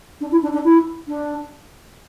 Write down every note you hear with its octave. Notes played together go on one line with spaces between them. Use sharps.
D4
E4
D4
D4
E4
D4